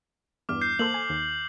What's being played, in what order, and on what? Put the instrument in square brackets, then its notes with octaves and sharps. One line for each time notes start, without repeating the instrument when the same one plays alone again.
[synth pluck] E2 G2 [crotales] D6 F6
[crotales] G6 C7
[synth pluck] A#3 A4 C5 [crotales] F#7
[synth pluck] G#5
D#2